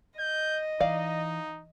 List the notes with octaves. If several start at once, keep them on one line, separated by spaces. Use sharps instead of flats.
D#5 G6
E3 D#4 D5 F5